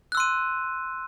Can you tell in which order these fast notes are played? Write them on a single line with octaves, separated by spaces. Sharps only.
F#6 E6 C6 D#7